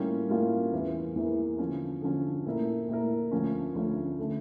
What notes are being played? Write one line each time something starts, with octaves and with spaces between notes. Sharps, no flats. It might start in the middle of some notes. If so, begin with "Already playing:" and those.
Already playing: A2 G3 A#3 C#4 F4
A2 G3 A#3 C#4 F4
E2 E3 A#3 E4
E2 E3 A#3 E4
D3 F3 C#4
D3 F3 C#4
A#2 A3 E4 A#4
A#2 A3 E4 A#4
D2 D3 F3 C#4
D2 D3 F3 C#4
D3 A3